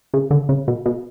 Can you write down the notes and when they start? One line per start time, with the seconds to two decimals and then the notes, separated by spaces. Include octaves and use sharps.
0.14 C#3
0.31 D3
0.49 C#3
0.68 B2
0.86 B2